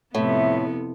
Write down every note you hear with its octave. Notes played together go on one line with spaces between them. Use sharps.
F2 A2 C3 B3 E5